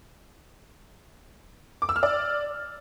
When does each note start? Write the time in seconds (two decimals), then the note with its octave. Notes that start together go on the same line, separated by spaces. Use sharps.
1.82 D6
1.89 E6
1.96 F6
2.03 D5